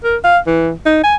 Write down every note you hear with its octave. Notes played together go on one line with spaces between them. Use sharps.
A#4
F5
E3
D#4
G#5